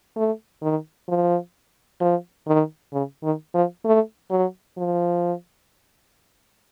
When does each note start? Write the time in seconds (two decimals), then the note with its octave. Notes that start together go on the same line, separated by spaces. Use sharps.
0.16 A3
0.62 D#3
1.08 F3
2.01 F3
2.47 D#3
2.93 C#3
3.23 D#3
3.54 F3
3.85 A3
4.31 F#3
4.78 F3